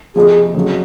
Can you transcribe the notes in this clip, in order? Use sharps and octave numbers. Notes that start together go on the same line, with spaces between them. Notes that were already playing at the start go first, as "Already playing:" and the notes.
F2 C3 F3 G#4
F2 C#3 F#3